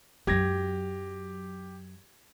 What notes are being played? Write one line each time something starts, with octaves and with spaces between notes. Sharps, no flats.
F#2 F#3 G4 G#6 A#6